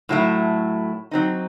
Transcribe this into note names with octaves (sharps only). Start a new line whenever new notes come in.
A2 F#3 A3 E4
F#3 C4 D#4